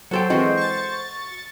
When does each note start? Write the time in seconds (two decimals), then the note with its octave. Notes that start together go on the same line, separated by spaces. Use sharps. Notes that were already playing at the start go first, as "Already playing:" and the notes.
0.11 F#3 F#4 A4 C5 G5
0.30 E3 G#3 C4 F#4 A4 D#5
0.57 C#6 A6